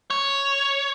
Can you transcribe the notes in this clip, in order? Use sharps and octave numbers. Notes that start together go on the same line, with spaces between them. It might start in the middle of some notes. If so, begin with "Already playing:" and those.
C#5